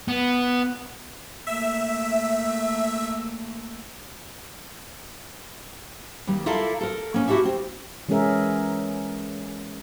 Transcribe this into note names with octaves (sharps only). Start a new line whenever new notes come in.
B3
A3 A#3 E5
D#2 G3
E4 F4 A4 A#4 D5 F5
A4 A#4
A#3 C#4
E4 F#4 G4 A4 E5
C4
E3 G#3 C#4 G#4 A#4 E5